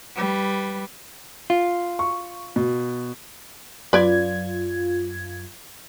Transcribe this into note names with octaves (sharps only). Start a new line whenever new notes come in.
G3 B4
F4
C#6
B2
F#2 F4 B4 D5 G#6